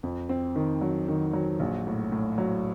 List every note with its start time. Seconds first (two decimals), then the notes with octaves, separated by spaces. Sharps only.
0.03 F2
0.29 C4
0.56 D#3
0.81 F#3
1.08 D#3
1.33 F#3
1.59 A#1
1.87 A2
2.12 A2
2.38 F#3